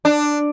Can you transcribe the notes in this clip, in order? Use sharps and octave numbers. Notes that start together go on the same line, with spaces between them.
D4